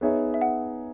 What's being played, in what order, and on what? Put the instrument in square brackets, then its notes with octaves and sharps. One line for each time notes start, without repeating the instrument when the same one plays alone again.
[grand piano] B3 D#4 G#4 C#5 E5
[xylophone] E5
F#5